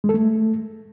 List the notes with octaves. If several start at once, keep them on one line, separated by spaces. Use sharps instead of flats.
G#3
A4
A3